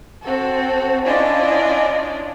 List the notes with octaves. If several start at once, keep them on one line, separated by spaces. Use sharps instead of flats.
C4 F#4 A4
C#4 D4 E4 F4 D5 D#5